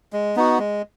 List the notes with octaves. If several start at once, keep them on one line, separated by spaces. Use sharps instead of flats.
G#3
B3 D#4 F#4
G#3